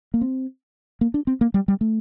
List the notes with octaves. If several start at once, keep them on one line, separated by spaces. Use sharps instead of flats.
A#3
C4
A#3
D4
C4
A#3
G3
G3
A3